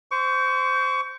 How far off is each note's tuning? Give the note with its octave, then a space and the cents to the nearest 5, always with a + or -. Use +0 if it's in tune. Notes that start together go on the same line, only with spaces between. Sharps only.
C5 -10 C#6 +30